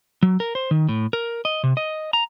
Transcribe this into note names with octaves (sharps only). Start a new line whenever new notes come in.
F#3
A#4
C5
D#3
A2
A#4
D#5
C3
D#5
A#5